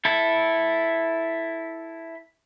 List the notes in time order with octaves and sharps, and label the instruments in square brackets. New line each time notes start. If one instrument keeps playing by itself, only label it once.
[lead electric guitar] E4 A4